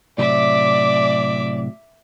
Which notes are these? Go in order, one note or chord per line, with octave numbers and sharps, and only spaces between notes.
A2 C3 F#3 D5 E5 D6